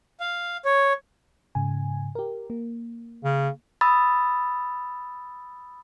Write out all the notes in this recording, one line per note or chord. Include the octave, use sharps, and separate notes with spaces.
F5
C#5
G#2 C#3 G#5
G4 A#4
A#3
C#3
B5 D#6 E6 A6